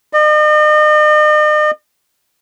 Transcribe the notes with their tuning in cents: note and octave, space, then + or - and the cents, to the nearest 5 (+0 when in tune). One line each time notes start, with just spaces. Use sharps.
D#5 -45